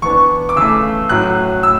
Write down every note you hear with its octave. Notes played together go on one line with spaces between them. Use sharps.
E3 B3 D4 C#6
D6
C#3 E3 A3 E6
A2 F#3 C#4 F#6
A2 E6